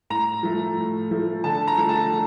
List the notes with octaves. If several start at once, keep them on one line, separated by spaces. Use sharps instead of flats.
A2 A#5
F3 A3
A2
F3 A3
D3 A5
A#5
F3 A3
A5
D3